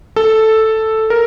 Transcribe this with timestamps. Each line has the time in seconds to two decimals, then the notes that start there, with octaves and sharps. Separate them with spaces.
0.16 A4
1.10 A#4